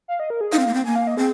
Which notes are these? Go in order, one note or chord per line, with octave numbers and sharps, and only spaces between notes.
F5
D#5
A#4
G#4
D#4 F5
C4
A#3
C4
A#3 G#5
F5
D#5
C4 G#4